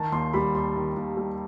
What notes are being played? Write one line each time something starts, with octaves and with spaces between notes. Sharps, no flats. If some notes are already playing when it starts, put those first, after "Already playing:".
Already playing: D#3 A5
D#2 C6
G3 B5
D#2 C6
D#3
D#2
G3